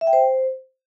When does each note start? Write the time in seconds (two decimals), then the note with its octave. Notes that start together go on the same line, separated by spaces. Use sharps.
0.01 E5
0.07 G5
0.13 C5